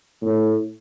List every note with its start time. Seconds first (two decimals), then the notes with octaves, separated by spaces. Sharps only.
0.22 A2